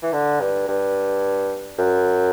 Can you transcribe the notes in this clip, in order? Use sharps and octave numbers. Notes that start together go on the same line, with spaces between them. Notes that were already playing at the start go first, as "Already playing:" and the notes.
E3
D3
G2
G2
F#2